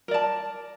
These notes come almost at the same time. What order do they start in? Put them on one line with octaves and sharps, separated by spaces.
A#4 D5 A5